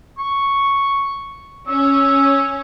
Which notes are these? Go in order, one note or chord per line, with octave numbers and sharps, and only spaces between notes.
C#6
C#4 E6